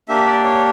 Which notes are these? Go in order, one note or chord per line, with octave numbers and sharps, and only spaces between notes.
A#3 D4 G4 E5
D5
C#5